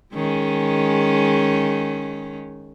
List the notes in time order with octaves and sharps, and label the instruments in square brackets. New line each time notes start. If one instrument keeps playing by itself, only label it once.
[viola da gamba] D#3 G#3 C#4